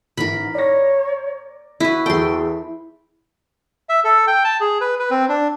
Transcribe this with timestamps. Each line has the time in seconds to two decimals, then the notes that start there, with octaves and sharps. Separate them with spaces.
0.17 A1 G#2 E4 A#4 B5
0.54 C#5 D5 A#6
1.80 E4 F#4 B4
2.06 E2 G#4 A4 G5 C6
3.89 E5
4.04 A4
4.27 G5
4.44 A5
4.61 G#4
4.81 B4
4.99 B4
5.11 C4
5.29 D4